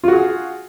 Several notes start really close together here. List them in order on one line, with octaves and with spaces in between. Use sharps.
F4 F#4 G#4